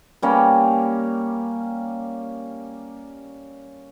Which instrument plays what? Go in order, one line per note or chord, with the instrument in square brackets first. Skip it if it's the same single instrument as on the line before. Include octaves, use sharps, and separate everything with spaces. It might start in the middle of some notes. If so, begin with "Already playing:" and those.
[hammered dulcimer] G3 A#3 C#4